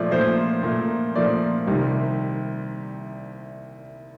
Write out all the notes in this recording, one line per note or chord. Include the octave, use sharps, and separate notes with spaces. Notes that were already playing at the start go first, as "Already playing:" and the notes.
Already playing: A#2 F3 A3 D5
A#2 F3 A3 C5
A#2 F3 A3
A#2 F3 A3 D5
C2 C3 D#3 G3